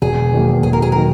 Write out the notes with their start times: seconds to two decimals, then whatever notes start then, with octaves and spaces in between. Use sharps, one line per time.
0.02 E1 G#4
0.32 E2 D#3 F#3 A#3
0.63 E1 G#4
0.73 A#4
0.82 G#4
0.92 D#3 F#3 A#3 A#4